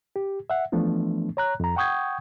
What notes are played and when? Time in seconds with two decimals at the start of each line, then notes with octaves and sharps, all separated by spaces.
0.16 G4
0.50 E5 F#5
0.72 E3 F3 A3 B3 D4
1.37 C#5 A#5 F#6
1.60 F2 A#5
1.76 F#5 G5 C#6 D#6 G6 G#6